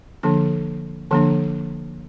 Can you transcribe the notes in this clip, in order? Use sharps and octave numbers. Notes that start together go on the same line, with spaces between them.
D3 F3 A#3 D4
D3 F3 A#3 D4